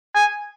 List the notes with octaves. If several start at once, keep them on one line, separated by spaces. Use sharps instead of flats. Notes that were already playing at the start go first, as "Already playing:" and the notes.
G#5